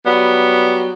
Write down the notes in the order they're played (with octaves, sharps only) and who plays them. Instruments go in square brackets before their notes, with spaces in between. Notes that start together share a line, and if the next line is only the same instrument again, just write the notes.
[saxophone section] F#3 G3 B3